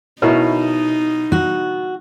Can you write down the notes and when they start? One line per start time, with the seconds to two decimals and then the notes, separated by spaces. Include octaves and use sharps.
0.22 B2 D#4 E4 A#4 C#5
1.32 F#4